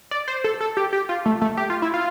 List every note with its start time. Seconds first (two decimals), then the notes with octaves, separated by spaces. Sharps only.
0.11 D5
0.28 C5
0.44 A4
0.61 A4
0.77 G4
0.93 G4
1.09 F4
1.26 A3
1.42 A3
1.57 G4
1.70 F4
1.82 E4
1.94 F4